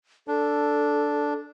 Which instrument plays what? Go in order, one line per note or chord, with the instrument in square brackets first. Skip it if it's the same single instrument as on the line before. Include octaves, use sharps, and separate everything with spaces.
[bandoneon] D4 [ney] A4